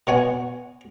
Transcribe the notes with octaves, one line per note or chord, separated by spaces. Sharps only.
B2 C#5 F#5 G#5